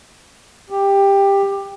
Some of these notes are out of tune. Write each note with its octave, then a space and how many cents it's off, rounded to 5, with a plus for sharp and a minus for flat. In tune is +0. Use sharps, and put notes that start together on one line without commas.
G4 +15